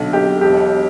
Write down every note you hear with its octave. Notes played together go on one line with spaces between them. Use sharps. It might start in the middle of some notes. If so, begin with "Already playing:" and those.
Already playing: B1 D3
B1 G4
E1 G4